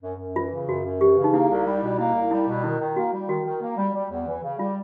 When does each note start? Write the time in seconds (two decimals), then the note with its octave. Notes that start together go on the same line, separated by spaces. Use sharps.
0.03 F#2
0.19 F#2
0.36 E3 F4
0.52 C#3
0.68 F#2 F#4
0.85 F#2
1.00 E3 G4
1.18 C#3
1.24 D#4
1.33 A#3 E4
1.49 C2
1.66 G3
1.83 B2
1.99 A#3 E4
2.15 C2
2.31 G3 E4
2.48 B2
2.64 D#3 E4
2.81 D#3
2.96 A#3 F#4
3.13 G3
3.29 D#3 F#4
3.45 D#3
3.61 A#3
3.77 G3
3.94 G3
4.11 E2
4.27 E3
4.43 C#3
4.59 G3 F4